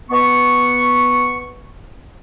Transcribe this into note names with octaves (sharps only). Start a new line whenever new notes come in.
B3 C#6